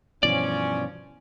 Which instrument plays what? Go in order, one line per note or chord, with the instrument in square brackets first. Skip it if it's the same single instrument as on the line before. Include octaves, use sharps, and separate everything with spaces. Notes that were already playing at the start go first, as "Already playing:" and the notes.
[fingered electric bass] G2 B2 E3 [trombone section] F3 C#4 [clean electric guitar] D5